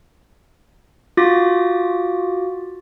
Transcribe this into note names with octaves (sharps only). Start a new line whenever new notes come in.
F4 F#4 D6 A6 A#6